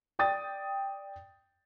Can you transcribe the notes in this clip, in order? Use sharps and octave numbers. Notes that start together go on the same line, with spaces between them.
D5 G5 D#6 A6